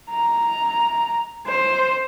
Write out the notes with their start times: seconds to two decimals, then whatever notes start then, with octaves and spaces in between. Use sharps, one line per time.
0.11 A#5
1.47 C5